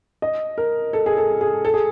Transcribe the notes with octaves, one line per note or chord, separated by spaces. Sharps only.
D#5
A#4
A4
G#4
A4
G#4
A4
G#4